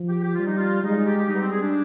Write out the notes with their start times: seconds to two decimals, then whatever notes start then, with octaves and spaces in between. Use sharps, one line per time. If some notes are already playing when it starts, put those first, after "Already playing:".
Already playing: F3
0.09 G4
0.23 G4
0.34 G3 F4
0.46 D#4
0.58 F4
0.83 G#3 D#4
1.06 G4
1.28 G3 D#4
1.35 B3
1.40 C4
1.51 G#4
1.62 D4